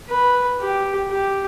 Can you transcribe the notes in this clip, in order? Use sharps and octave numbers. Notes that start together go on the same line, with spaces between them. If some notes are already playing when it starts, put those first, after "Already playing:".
B4
G4
G4